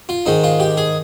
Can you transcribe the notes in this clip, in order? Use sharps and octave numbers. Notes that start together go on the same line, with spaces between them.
F4
G#2 D#3 G#3 D#4
F4
G4
G#4